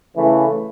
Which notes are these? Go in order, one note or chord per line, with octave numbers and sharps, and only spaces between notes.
C#3 E3 A3 E4